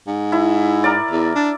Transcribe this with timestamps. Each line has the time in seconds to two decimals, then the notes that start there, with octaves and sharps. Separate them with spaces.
0.07 G#2
0.32 E4
0.84 A#4 D5
1.11 E2
1.35 D4